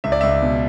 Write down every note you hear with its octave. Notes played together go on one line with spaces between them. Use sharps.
C#2 E5
D5
C#2 E5
B2